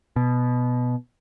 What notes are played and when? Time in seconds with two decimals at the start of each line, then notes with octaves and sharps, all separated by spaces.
0.16 B2